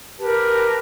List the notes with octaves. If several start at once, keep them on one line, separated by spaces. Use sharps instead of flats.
G4 A#4 B4 A5